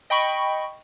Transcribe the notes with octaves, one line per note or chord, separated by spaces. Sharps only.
D#5 G5 B5 C#6